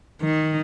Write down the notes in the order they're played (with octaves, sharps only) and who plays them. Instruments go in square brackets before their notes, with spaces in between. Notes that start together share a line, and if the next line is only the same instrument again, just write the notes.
[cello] D#3